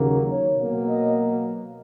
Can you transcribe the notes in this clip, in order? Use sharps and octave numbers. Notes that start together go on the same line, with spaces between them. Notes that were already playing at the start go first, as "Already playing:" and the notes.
Already playing: D#2 C#3 F#3 A#3
C#5
B2 F#3 A#3
D#5